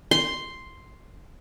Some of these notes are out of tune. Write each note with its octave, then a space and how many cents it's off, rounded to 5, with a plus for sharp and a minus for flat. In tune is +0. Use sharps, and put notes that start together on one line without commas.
C6 +0